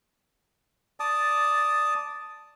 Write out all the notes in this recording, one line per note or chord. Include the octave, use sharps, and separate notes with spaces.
D5 A5 D#6